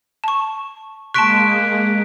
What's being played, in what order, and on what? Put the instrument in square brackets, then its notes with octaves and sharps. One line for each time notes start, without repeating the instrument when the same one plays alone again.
[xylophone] A5 C#6
[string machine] G#3 A#3 [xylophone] A5 C6 C#6 [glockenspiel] F#6 B6 D7